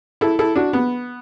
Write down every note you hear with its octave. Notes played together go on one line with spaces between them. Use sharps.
E4 A4
E4 A4
D4 F#4
B3